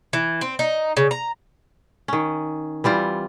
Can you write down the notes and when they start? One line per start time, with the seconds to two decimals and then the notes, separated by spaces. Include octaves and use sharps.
0.13 E3
0.41 C4
0.59 D#4
0.97 C#3
1.11 A#5
2.08 D#3 C#4
2.84 E3 G3 C4 F4